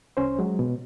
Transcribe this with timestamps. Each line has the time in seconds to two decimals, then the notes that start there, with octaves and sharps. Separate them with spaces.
0.17 C2 C#4 C5
0.39 F#3 G#3
0.59 B2